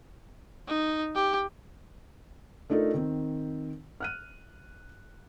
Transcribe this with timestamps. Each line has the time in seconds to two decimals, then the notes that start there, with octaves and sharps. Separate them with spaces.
0.67 D#4
1.15 G4
2.70 A3 D4 D#4 F4 A4 A#4
2.94 D#3 C4
4.00 F6 F#6 D#7